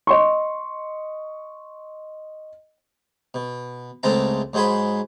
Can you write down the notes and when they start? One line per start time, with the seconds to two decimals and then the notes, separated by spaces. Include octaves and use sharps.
0.07 D#5 C6 C#6
3.34 B2
4.03 C#2 G#3 A3 C4 A5 A#5
4.53 G#2 F#3 G#3 C5 G#5 B5